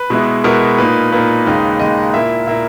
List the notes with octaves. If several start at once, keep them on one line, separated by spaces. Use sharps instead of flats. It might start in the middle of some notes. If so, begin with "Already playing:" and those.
Already playing: B4
B2 G#3 B3 E4
B2 G#3 B3 E4 A#4
A#2 A#3 D#4 B4
A#2 A#3 D#4 B4
D#2 C#3 G#3 D#4
D#2 C#3 G#3 D#4 D#5
A#2 A#3 E4 E5
A#2 A#3 E4 E5